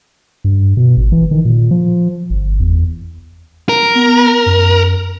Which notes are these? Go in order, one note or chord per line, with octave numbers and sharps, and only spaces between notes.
G2
B2
G#1
E3
D#3
A#2
F3
G1
E2
A#4
B3
F#2